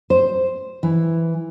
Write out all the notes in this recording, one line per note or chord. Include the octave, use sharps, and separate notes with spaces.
C5
E3